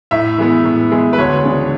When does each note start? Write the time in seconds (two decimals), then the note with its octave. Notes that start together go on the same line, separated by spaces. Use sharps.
0.11 A2 E5
0.38 E3 G#3 B3
0.65 A2
0.91 E3 G#3 B3
1.13 B4
1.18 D2 C#5
1.45 C#3 E3 G#3 D4